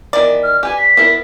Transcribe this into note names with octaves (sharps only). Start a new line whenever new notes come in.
D#3 E3 B3 D5
F6
G4 B4 G#5
B6
B3 E4 A#4